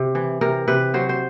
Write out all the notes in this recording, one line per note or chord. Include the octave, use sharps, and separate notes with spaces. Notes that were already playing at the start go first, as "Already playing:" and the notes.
Already playing: C3
E3
C3 A#4
C3 B4
F#3 C5
C5